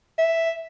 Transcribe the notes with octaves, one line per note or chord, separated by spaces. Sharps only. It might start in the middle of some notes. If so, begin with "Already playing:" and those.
E5